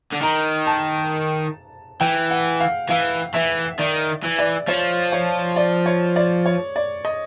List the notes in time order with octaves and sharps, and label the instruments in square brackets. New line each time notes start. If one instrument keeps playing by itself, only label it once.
[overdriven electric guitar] D3
[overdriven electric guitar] D#3 [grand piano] A#5
[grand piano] A5
[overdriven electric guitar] E3 [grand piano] G5
[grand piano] F#5
F5
[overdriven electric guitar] E3 [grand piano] F5
[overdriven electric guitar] E3 [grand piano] E5
[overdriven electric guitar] D#3 [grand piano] D5
[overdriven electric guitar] E3
[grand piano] D5
[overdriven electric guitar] F3 [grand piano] C#5
[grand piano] C#5
D5
C#5
D5
C#5
D5
D#5